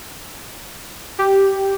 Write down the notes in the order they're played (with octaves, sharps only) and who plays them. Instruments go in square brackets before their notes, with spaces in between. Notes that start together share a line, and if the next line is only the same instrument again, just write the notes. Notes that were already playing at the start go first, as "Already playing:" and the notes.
[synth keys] G4